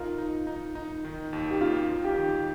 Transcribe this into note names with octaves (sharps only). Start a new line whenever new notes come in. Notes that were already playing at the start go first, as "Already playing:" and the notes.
Already playing: D#4 F4 A#4
D#4
D#4
D#4
D#3
D#2
G4
A#3 F4
D#2
G4
D#3